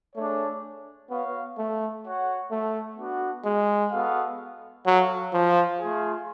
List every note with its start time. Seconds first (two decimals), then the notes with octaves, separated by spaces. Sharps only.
0.16 A3 D4 G#4 C#5
1.10 B3 F#4 C#5 F5
1.58 A3
2.04 F#4 C#5 F#5
2.51 A3
2.98 B3 D4 F#4
3.45 G#3
3.92 B3 F#4 A4 F5
4.86 F#3 F#4 A4 F5
5.33 F3
5.80 A3 F4 G#4